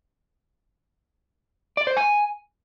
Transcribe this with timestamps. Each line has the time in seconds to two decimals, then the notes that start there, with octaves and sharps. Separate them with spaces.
1.77 D5
1.87 C5
1.97 G#5